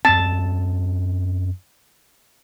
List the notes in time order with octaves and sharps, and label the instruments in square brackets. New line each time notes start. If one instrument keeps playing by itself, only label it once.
[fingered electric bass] F#2 B3 C4 [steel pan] A5